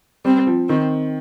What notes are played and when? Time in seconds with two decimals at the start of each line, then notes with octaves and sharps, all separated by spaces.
0.25 G3 C4
0.47 F3
0.69 D#3 C4